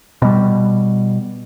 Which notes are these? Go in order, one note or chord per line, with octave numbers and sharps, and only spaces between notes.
B2 G3